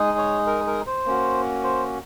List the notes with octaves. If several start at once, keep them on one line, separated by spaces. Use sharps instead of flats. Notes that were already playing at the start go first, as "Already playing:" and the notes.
Already playing: G#3 D#4 G#4
C#5
A#4
A#4
C5
A#3 C#4 F#4
C5